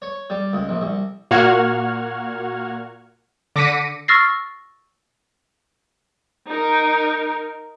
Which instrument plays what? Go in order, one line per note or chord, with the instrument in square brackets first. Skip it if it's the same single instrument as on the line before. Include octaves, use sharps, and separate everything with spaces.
[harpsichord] C#5
G3
C#2
A#1
C2
[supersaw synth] A#2 A#3 F#4 F#5 F6 G#6
D3 D6 A#6 B6 C#7 D#7
[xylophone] C#6 E6 F6 A6 A#6 C7
[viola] D#4 A#4